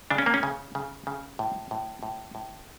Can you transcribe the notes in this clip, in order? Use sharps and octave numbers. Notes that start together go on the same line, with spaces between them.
C#3 D4
C#4
A#3
C#4
C#3
C#3
C#3
A2
A2
A2
A2